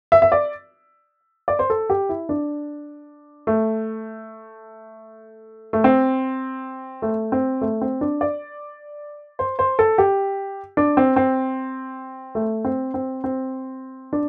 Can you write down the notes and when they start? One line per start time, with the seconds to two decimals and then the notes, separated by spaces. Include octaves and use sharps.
0.12 E5
0.22 E5
0.32 D5
1.48 D5
1.59 C5
1.70 A4
1.90 G4
2.09 E4
2.29 D4
3.47 A3
5.73 A3
5.84 C4
7.02 A3
7.32 C4
7.61 A3
7.81 C4
8.01 D4
8.21 D5
9.39 C5
9.59 C5
9.79 A4
9.98 G4
10.77 D4
10.97 C4
11.16 C4
12.35 A3
12.65 C4
12.94 C4
13.24 C4
14.13 D4